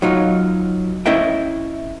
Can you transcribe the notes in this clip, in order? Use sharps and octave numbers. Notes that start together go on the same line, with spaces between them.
F#3 D#4 F4
C#4 E4 D#5 E5 G5